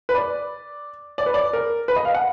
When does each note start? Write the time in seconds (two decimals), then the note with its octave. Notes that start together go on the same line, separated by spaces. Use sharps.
0.09 B4
0.15 D5
1.18 D5
1.26 B4
1.34 D5
1.53 A#4
1.88 B4
1.96 D#5
2.05 F5
2.15 F#5